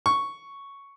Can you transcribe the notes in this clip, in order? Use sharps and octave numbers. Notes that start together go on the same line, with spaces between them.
C#6